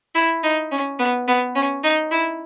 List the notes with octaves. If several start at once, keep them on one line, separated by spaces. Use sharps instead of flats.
E4
D#4
C#4
B3
B3
C#4
D#4
E4